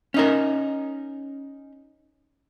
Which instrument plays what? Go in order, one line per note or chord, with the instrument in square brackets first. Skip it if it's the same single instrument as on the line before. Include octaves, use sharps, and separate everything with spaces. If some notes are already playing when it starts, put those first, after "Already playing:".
[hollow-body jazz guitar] C#4 D#4 A#4